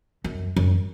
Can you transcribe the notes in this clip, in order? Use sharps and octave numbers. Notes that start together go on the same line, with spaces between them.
F#2
F#2